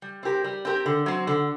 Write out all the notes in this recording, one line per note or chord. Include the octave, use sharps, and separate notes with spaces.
G3
C4 G4 A#4
G3
C4 G4 A#4
D3
F#3 C4
D3